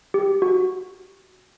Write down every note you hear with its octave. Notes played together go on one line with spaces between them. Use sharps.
G4
F#4